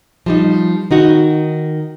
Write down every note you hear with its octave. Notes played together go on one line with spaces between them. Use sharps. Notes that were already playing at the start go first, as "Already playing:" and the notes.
F3 G3 D#4
D#3 D#4 F#4